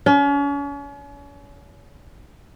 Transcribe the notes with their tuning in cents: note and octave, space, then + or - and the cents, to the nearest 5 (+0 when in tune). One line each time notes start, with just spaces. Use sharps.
C#4 +40